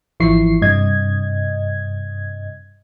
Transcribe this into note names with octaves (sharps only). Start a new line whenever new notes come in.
G#1 E3 F3 E4 C#6 C7
G2 C3 D#5 G#6